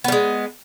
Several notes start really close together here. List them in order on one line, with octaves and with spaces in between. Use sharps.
B3 G3 G#3